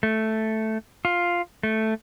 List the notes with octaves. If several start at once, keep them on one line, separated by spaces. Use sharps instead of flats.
A3
F4
A3